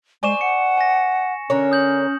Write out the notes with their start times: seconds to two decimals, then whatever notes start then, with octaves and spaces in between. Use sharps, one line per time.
0.23 G#3 C5 D5 G#5 C#6 E7
0.41 F#5 C#7
0.78 G#5 A#6
1.50 D3 C#4 A#4 C#5
1.71 D#6 G6 F#7